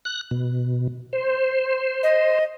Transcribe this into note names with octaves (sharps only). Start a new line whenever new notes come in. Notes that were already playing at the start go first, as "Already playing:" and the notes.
F#6
B2
C5
D#5